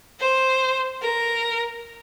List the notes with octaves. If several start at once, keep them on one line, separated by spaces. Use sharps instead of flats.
C5
A#4